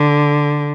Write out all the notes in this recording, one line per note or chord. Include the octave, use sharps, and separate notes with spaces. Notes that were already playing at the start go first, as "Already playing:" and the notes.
Already playing: D3